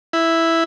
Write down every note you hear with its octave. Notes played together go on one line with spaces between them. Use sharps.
E4